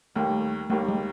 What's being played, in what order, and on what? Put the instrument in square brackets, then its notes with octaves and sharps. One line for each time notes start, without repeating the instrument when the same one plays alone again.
[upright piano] D#2 D#3 G3 A#3 [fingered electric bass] A3
[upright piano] D#2 D#3 G3 A#3 [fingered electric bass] A3
[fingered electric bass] G#3